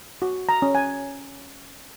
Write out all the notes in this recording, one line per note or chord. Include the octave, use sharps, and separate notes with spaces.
F#4
A#5
C#4
G#5